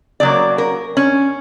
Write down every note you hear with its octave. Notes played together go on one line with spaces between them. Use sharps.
C#3 F#3 A#3 D5
A#4
C#4